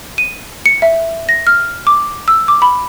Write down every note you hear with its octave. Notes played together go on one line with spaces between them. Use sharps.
D#7
C#7
E5
A#6
F6
D6
E6
D6
B5